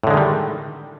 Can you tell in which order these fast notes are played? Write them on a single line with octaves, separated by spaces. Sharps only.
A2 D3 G#3 D#3 G3